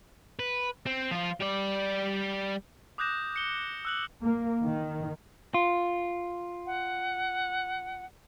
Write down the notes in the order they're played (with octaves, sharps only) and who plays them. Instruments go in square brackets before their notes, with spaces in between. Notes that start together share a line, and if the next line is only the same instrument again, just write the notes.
[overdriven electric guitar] B4
C4
F3 F4
G3 D5
[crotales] D6 D#6 F#6 G6 A#6 E7
C#7 G7
E6 F#6 F#7
[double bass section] A#3
D#3
[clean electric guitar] F4
[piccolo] F#5